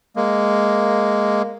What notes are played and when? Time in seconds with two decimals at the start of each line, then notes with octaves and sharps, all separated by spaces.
0.16 G#3 A#3